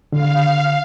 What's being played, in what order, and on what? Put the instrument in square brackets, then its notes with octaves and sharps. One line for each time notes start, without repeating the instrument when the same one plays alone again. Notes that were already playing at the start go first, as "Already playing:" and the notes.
[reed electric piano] D3 [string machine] F5